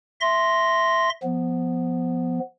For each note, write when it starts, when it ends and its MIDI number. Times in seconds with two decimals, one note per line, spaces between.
0.21 1.10 76
0.21 1.10 84
0.21 1.10 94
1.23 2.39 53
1.23 2.39 59